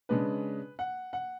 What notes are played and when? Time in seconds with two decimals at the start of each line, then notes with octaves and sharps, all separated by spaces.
0.09 C#3 G#3 D4 B4
0.79 F#5
1.13 F#5